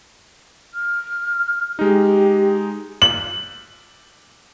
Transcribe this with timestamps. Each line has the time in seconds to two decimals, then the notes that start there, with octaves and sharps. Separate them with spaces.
0.74 F6
1.79 G#3 D#4 G4
3.02 F#7